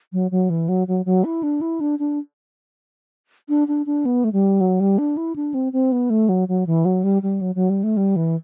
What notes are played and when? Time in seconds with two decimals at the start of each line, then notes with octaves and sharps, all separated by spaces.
0.13 F#3
0.31 F#3
0.50 E3
0.68 F#3
0.87 F#3
1.05 F#3
1.24 E4
1.43 D4
1.61 E4
1.80 D4
1.99 D4
3.49 D4
3.68 D4
3.86 D4
4.05 B3
4.24 A3
4.32 G3
4.60 F#3
4.80 G3
4.98 D4
5.17 E4
5.36 D4
5.54 C4
5.73 C4
5.92 B3
6.10 A3
6.29 F#3
6.48 F#3
6.67 E3
6.85 F#3
7.04 G3
7.22 G3
7.41 F#3
7.55 F#3
7.70 G3
7.83 A3
7.97 G3
8.16 E3